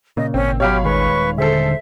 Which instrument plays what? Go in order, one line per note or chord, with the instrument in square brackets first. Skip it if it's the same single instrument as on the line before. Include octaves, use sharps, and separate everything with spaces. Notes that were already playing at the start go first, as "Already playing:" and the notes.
[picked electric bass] A#2 C#3 [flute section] D#5
[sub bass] G#1 [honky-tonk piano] C4 [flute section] C#4
[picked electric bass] B2 F#3 [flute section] G4 F6 [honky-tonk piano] C#5 F5 B5
[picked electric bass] D#1 D#3 G#3 [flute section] B4 C#6
[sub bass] D3 [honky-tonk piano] G#4 A4 [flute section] C5 E5